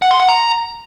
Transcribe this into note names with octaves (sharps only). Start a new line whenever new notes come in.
F#5
C6
F#5
A#5